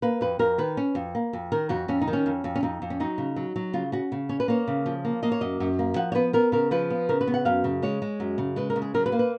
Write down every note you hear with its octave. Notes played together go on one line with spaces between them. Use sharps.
A#3 B4
F2 B4
F2 A#4
D#3 B4
C#4
F2
A#3
F2
D#3 A#4
F2 F#4
F2 C#4
D#4
D#3
C#4
F2
F2
C#4
F2 D#4
F2
C#4
F#3 D#4
C#3
F#3
F#3
C#3 F4
C#4 F#4
C#3
C#4 C#5
B4
A#3 C#5
C#3
F3
A#3
A#3 D#5
C#5
F#2 D#5
F#2
A#3
F3 F#5
C#5
B3 B4
B3 A#4
C#3 A#4
F3 B4
B3
C#3 A#4
B4
B3
F#5
F#2 F5
C#3
G#3 C#5
G#3
F#2
C#3
G#3 B4
A#4
C#3
G#4
F#3 A#4
B4
A#3
B4